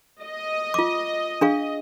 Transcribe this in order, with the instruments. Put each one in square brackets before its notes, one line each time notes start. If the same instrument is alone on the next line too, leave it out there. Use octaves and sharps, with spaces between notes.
[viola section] D#5
[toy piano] F4 D6
D4 G#4 F5